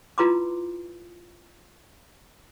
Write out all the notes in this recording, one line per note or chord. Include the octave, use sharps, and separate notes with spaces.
E4 F4 B4 A#5 C6 D6